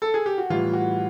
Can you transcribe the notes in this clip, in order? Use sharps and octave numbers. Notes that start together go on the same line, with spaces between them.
A4
G#4
G4
F#4
A2 E3 G3 F4
F#4